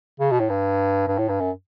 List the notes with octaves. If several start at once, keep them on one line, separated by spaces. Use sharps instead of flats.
C#3
B2
A2
G2
G2
A2
G2
F#2